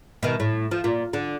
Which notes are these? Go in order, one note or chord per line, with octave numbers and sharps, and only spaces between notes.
B2 D#3
A2
F3
A#2
D3